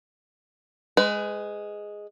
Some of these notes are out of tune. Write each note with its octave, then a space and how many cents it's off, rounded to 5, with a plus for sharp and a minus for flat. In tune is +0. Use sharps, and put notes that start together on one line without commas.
G#3 +0 B4 +35